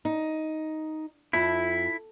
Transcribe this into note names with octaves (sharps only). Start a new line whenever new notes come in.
D#4
F2 E4